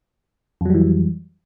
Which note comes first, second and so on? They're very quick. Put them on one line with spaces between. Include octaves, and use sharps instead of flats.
F2 F#3 G3 E3